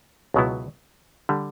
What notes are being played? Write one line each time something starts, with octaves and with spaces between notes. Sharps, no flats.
C#2 B2 F#3 B3 E4
D3 G3